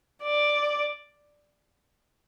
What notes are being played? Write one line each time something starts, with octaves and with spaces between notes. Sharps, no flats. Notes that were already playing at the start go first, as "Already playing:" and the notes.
D5